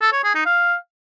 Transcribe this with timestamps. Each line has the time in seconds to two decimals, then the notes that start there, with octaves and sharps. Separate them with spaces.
0.01 A4
0.12 C#5
0.24 G#4
0.35 D#4
0.46 F5